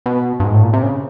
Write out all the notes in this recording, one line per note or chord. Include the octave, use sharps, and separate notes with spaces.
B2
G2
G#2
A2
A#2
C3
C#3